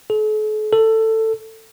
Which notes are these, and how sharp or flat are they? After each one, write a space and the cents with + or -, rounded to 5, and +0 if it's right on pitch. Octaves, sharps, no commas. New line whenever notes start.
A4 -45
A4 +15